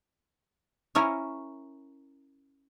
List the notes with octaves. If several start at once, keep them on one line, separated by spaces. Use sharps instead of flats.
C#4 E4 A#4 C#5